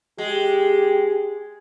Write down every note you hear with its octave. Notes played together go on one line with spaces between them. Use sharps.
G#3 G4